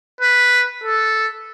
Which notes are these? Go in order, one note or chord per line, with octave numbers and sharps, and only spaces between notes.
B4
A4